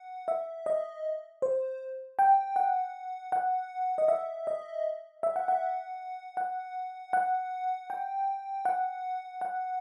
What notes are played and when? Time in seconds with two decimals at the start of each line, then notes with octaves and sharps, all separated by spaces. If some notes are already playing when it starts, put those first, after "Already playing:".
Already playing: F#5
0.28 E5
0.66 D#5
1.42 C5
2.19 G5
2.56 F#5
3.32 F#5
3.98 D#5
4.08 E5
4.47 D#5
5.23 E5
5.36 F#5
5.48 F#5
6.37 F#5
7.13 F#5
7.90 G5
8.65 F#5
9.41 F#5